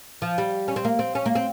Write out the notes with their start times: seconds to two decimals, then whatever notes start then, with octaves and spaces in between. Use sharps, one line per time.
0.22 F3
0.38 G3
0.68 C#4
0.76 C4
0.85 A#3
0.99 C4
1.15 C#4
1.26 A#3
1.35 C4